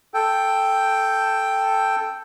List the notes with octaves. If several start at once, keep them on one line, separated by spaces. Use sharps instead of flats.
A4 G5